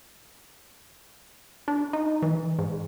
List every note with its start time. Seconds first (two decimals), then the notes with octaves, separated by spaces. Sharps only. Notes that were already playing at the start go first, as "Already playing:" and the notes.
1.68 D4
1.93 D#4
2.22 E3
2.59 G#2